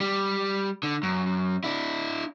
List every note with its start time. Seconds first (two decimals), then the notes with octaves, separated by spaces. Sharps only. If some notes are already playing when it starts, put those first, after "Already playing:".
0.01 G3
0.83 D3
1.03 F#2
1.64 D4 E4